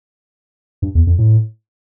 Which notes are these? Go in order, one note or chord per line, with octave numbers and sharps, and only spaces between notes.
G2
E2
F2
A2